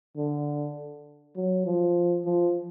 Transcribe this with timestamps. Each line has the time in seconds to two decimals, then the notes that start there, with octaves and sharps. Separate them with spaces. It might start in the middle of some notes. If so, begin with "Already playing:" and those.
0.17 D3
1.36 F#3
1.66 F3
2.25 F3